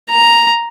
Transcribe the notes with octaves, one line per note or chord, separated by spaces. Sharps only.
A#5